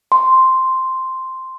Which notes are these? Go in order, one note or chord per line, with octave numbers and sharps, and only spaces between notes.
C6